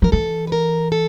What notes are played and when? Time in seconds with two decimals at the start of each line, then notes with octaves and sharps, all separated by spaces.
0.02 F3 A#4
0.12 E3 A4
0.47 B4
0.52 A#4
0.92 A4